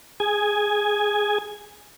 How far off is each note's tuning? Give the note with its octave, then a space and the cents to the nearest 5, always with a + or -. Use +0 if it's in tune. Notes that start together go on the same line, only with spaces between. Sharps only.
G#4 +0 G#5 +0